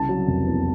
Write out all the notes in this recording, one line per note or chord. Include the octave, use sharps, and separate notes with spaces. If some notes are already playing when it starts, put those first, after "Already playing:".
Already playing: C2 C#3 A5
F#3
F1
E2